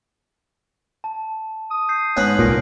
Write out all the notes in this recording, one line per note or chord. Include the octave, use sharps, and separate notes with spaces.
A5
D#6
G6 C7
G#2 B3 C#4 F#6 C7 F#7
C2 A#2 A#4